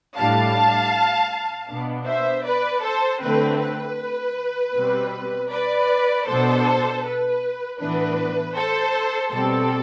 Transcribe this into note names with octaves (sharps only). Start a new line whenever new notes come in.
A2 G3 D4 F5 A5
B2 B3 D4
C5 E5
B4 D5
A4 C5
D3 A3 C4 B4
B4
B2 G3 C4
B4 D5
B2 B3 D4 A4 C5
B4
A2 E3 B3 D4 B4
A4 C5
B2 G3 C4 A4